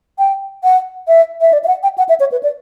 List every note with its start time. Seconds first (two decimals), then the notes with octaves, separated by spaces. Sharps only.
0.19 G5
0.64 F#5
1.08 E5
1.41 E5
1.53 D5
1.64 E5
1.68 F#5
1.83 G5
1.98 F#5
2.09 E5
2.20 C#5
2.32 B4
2.43 D5